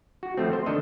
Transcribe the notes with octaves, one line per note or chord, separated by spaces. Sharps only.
F#4
F3 A3 C4
C5
D#3 D4 A4 D#5